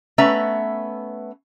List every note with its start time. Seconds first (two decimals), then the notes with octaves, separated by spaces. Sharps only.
0.18 A3 B3 C#4 B4 E5 A#5